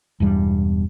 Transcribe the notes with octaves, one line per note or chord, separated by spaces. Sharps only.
E1 E2 G2 G3